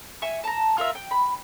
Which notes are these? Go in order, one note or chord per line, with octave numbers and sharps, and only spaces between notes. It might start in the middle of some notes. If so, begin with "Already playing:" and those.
E5 G#5 C#6
A5 A#5
F4 A#4 E5
G5
B5